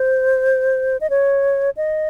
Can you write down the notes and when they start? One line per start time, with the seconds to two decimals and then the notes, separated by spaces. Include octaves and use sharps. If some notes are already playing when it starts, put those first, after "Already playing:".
Already playing: C5
1.01 D#5
1.10 C#5
1.77 D#5